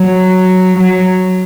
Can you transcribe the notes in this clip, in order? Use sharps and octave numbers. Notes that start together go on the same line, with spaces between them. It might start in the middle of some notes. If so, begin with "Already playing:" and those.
Already playing: F#3
F#3